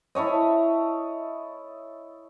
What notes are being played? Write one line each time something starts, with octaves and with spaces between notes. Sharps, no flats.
E4 A4 C#5 D#5